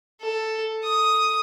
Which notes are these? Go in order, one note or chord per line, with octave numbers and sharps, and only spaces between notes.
A4
D#6